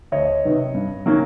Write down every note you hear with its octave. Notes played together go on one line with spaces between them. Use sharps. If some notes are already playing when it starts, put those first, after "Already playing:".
D2 C#5 D#5
C3 D#3 F#3 B3
G2
D#3 F#3 A#3 C#4